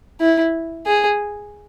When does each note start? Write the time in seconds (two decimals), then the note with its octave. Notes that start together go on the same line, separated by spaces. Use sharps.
0.21 E4
0.86 G#4